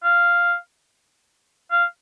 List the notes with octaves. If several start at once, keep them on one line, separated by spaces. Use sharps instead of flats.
F5
F5